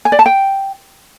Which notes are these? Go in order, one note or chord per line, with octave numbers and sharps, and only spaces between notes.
G#5
D5
A5
G5